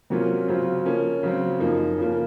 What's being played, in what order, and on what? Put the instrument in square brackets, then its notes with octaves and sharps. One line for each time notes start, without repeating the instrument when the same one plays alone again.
[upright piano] C3 F#3 A#3 C#4 F4
C#3 F#3 C4 F4
F3 A#3 C#4
C#3 F#3 C4
F#2 F3 A#3 D#4
C#3 F3 A#3